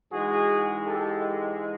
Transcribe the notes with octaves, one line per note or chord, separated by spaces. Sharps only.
G#2 E3 G#3 F#4 G#4
G4 A4